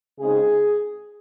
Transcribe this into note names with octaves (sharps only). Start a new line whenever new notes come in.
C#3 G#3 C4 D#4 G#4